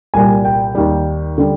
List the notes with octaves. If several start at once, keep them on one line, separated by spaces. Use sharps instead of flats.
C2 A#2 G3 G#5
G5
D#2 D#3 G3
D3 G3